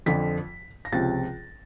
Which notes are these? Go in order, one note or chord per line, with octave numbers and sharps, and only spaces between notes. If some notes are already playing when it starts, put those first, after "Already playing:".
F2 D3 F3 B6
A#6
C#2 C3 F3 A6